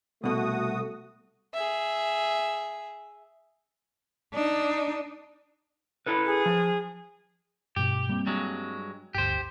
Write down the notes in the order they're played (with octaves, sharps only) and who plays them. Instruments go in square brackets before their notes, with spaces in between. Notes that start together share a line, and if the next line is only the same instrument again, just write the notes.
[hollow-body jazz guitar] C2 B2 [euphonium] A3 [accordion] F#4 D#6
[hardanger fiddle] G#4 E5
[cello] D4 D#4
[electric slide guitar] E4 A4 B4
[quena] G#4
[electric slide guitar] F3
[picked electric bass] G2 B2 [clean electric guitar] G4
[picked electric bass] G3 A#3 C4
[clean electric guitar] G2 F#3 G#3
[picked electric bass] G1 D2 [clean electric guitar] G4 C5